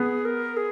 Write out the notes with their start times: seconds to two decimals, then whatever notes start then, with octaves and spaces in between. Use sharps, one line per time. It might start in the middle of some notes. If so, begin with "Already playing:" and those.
Already playing: B3 G#4
0.25 A#4
0.57 G#4